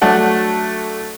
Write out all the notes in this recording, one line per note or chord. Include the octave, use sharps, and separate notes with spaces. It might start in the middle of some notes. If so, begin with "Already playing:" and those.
F#3 A3 D4 F#5